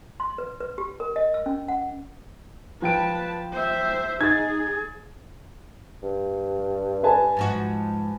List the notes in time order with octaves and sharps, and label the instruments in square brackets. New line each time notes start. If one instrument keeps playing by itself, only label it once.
[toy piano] C6
B4
B4
G4
A#4
D#5
E6
C#4
F#5
[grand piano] F3 G5 D7 [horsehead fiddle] B4 A5
[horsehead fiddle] C5 E5
[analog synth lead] D#4 [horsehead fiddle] G#4 [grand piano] G#6 A6
[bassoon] G2
[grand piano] B4 G#5 A5
[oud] G#2 F3 F#4